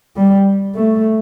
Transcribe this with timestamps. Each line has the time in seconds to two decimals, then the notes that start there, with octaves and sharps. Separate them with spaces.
0.16 G3
0.75 A3